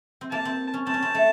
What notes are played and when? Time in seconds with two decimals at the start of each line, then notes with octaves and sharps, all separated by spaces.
0.21 C4
0.31 A#3 A5
0.45 C4
0.74 C#4
0.87 C4 A5
0.94 C#4
1.03 C4
1.14 A3